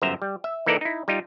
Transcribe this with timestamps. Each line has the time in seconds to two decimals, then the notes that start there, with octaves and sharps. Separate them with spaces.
0.02 G1 F#2 C5 E5 A#5
0.22 G3
0.44 E5
0.66 E3 A#3 D#4 A4 A#4 D5
0.81 D#4 E4
1.08 G3 D#4 F4